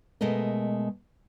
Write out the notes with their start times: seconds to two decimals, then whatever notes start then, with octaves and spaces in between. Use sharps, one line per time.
0.21 B2 G#3 A3 A#4 D#5